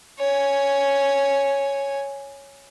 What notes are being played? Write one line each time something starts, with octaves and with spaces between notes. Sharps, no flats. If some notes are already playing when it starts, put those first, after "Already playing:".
C#5 G#5